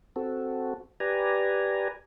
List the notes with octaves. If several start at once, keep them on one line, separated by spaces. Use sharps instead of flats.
C4 F#4 A4
G4 B4 D5 G#5 A#5